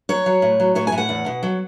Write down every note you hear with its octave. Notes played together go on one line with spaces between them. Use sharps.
F#3 C#5
F#3
A2
F#3
A2 C#5
G#5
A2
F#5
E2
B2
F#3